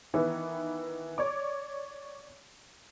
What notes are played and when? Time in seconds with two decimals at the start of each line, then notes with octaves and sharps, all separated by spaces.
0.14 D#3 E3 B3
1.18 C#5 D5 D6